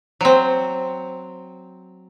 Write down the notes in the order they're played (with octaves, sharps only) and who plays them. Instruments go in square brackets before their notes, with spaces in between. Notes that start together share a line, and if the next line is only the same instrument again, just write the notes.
[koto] F#3 C4